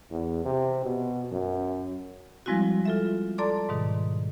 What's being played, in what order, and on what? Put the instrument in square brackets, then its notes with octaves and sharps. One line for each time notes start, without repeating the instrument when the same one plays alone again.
[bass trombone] E2
C3
B2
F#2
[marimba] F3 G3 G#3 C4 E4 F#4
F4 A4 E5
A4 D5 A5 A#5 C6 D6
G#2 B2 D#3